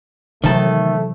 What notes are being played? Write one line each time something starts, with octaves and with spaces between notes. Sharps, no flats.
C3 D#3 E3 F#3 G#3 A3 A5